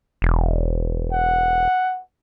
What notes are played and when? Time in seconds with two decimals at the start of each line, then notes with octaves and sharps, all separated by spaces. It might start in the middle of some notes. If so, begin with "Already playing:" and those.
0.22 E1
1.12 F#5